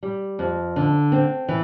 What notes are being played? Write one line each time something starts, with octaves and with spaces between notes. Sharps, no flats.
G3
F2
D3
C4
E3